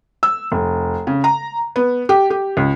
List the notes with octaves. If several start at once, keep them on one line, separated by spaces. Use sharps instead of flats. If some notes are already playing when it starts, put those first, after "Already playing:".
E6
F1
C#3
A#5
B3
G4
G4
C#2